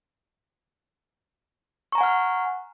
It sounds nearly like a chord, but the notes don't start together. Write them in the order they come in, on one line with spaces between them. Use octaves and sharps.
C#6 A#5 G#5 F#5 F6